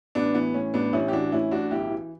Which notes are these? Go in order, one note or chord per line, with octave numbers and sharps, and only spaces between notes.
A1 B3 D4
E3 B3
A2 C#4
A1 B3 D4
A1 C#4 E4
G4
E3 D4 F#4
A2 C#4 E4
A1 D4 F#4
B1 E4 G4
E3